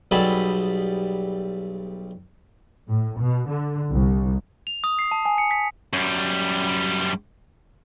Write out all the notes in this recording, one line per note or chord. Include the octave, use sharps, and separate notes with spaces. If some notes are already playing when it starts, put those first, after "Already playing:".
B1 G3 G#4 A4 B5
A2
B2
D3
C2
F7
D#6
C7
A5
G#5
C#7
B6
F#2 G3